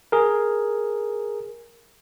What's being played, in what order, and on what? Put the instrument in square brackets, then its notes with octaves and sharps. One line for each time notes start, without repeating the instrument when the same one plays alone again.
[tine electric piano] G#4 A#4